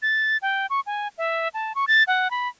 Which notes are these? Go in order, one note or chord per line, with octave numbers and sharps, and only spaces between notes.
A6
G5
C#6
G#5
E5
A5
C#6
A6
F#5
B5